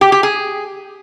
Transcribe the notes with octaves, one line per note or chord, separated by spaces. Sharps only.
G4
G4
G#4